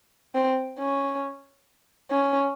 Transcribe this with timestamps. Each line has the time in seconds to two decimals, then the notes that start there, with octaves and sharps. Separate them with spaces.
0.35 C4
0.79 C#4
2.11 C#4